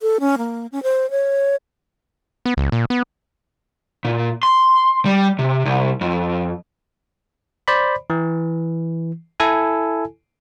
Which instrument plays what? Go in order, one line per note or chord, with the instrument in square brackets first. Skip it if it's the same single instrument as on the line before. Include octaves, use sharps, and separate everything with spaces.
[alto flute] A4
C#4
A#3
C#4
C5
C#5
[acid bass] B3
C#2
A#2
B3
[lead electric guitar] A#2
C6
G3
C3
C2
F2
[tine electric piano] C5 D5 B5
E3
E4 A4 G#5